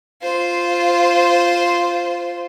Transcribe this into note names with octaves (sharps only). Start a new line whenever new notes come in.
F4 C5